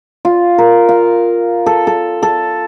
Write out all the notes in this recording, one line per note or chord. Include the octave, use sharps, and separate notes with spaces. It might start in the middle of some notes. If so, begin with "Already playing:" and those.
F4
A#4
F5
A4
A4
A4